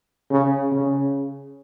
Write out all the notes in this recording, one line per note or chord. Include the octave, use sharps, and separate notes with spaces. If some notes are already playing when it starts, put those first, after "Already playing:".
C#3
C#3